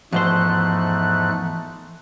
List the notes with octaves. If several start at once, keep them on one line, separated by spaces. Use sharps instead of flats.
E2 G#2 F3 A3 C5 F#6